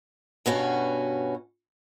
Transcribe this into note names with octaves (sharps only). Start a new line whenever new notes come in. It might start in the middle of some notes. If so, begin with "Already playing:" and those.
G2 B2 C#4 F#4